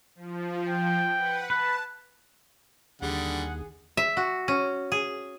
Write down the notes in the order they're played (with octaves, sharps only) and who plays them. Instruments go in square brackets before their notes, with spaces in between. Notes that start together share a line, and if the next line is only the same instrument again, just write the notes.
[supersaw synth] F3
[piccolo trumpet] G5
[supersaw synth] B4 F#5
[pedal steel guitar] B4 [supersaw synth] A5
[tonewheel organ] D#2 [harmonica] D3 G3 [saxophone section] G#4 [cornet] F#5
[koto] E5
F#4
C#4
G#4